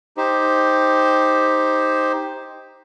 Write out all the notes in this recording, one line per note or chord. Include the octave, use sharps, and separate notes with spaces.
D#4 G4 C5